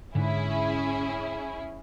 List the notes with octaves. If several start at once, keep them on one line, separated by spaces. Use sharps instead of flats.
G#2 D3 C#4 E4 G#4